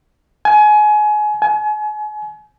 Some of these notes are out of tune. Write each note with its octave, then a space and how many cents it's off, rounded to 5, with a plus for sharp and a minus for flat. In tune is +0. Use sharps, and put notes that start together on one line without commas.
G#5 +25
G#5 +35